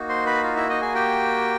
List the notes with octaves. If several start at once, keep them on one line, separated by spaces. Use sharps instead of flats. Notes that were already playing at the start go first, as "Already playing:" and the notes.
Already playing: A#3 D#4 F#4
C5 C6
B4 B5
F4 F5
E4 E5
D#4 D#5
G#4 G#5
G4 G5